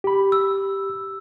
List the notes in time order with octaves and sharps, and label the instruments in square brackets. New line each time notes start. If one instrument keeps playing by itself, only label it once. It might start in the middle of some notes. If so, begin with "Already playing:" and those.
[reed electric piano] G4 B5
[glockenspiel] E6